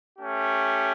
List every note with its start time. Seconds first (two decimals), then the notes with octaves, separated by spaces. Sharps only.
0.18 A3 C#4 G4